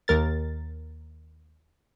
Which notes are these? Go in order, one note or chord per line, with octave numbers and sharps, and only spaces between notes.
D#2 A#4 A6